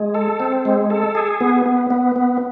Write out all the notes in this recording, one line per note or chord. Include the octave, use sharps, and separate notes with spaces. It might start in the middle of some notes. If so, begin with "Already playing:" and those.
Already playing: G#3
A4
C4
G#3
A4
G#4
B3
B3
B3
B3